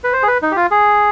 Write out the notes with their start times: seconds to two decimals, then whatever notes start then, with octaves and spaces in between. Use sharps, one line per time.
0.04 B4
0.13 C5
0.23 G#4
0.28 B4
0.42 D#4
0.51 G4
0.56 F4
0.71 G#4